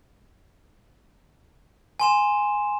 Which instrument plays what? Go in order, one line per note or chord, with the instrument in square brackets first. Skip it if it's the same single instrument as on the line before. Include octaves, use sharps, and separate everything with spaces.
[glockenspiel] G#5 C6 E7